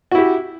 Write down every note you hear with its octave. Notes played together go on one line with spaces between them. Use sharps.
E4 F#4 G4